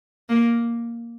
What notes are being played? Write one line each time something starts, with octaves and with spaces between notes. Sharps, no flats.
A#3